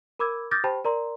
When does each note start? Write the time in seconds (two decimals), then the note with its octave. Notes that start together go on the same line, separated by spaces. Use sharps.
0.19 A#4 B5 D6 E6 G#6
0.51 D6 D#6 F6 G6 A6 A#6
0.64 G4 C5 G5 A5 B5
0.85 A#4 D5 A#5 C6